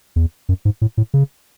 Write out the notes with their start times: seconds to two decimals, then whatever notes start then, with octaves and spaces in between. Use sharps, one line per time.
0.16 E2
0.49 F#2
0.65 G#2
0.81 A2
0.97 A2
1.14 C#3